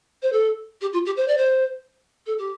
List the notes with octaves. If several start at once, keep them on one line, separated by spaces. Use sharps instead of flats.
C5
A4
G4
F4
G4
C5
D5
C5
A4
G4